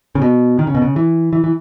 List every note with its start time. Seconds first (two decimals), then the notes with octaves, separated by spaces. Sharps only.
0.15 C#3
0.22 B2
0.59 D#3
0.67 C#3
0.75 B2
0.82 C#3
0.96 E3
1.33 E3
1.44 E3